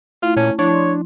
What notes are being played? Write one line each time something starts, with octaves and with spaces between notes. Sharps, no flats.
A3 E4 F4
A#2 C#4 A5
F3 D4 E4 C#5
C6